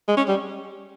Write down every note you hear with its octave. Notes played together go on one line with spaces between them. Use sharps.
G#3
C#4
G3